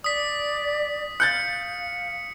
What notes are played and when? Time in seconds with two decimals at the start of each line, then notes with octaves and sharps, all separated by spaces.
0.04 D5 D#6 B6
1.20 F5 F#6 G6 A6 C#7